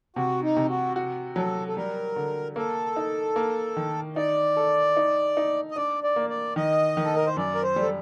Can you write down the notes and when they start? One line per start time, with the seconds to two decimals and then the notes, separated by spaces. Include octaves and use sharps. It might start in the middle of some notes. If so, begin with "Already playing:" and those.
0.16 C3 F#4
0.43 D#4
0.56 C3
0.69 F#4
0.96 F#4
1.36 F#3 A4
1.68 A4
1.76 G3 A#4
2.16 D3
2.56 A#3 A4
2.96 D#4
3.36 A#3
3.77 D#3
4.16 D#4 D5
4.57 A4
4.97 D#4
5.37 D#4
5.71 D#5
5.76 D4 D5
6.04 D5
6.16 A#3
6.30 D5
6.56 D#3 D#5
6.97 D#3
7.04 A4
7.16 A#4
7.26 C5
7.37 F#2 D5
7.55 A#4
7.63 C5
7.76 G3
7.82 A4